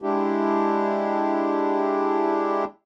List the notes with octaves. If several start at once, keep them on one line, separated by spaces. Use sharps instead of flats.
G#3 D4 E4 G4